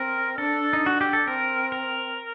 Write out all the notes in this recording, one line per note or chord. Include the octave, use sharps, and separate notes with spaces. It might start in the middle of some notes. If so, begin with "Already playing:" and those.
Already playing: C4 A#4
D4 A4
D#4
D4 F#4
G4
A4
C4 A#4
A#4